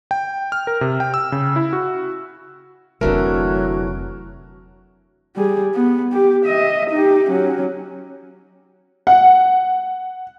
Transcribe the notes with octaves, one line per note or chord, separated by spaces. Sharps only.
G5
F6
A#4
C3
G5
E6
C#3
E4
F#4
F1 D3 E3 F#3 A3 C4 A#4
G3 G#4
B3
G4
D#5 E5
D#4 G4
F#3 C#4
F#5